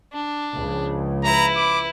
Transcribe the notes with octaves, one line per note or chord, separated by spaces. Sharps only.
D4
C#2 C#3 F3
E4 B4 A#5
D6